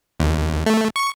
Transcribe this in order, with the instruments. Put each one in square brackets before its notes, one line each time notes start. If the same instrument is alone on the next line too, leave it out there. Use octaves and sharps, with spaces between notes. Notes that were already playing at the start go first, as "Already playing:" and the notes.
[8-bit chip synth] D#2
A3
C#6